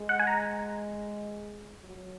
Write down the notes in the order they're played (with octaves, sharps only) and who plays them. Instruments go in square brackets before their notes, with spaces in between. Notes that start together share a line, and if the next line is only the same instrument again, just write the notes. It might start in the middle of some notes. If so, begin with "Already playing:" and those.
Already playing: [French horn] G#3
[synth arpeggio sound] F#5
G#5
A#5
[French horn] F#3